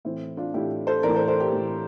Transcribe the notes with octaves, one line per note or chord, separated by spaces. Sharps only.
A2 E3 C4 E4
D4 F4
A2 E3 E4 G4
A4 C5
A2 E3 A#4 D5
A4 C5
A4 C5
G4 A#4
A2 E3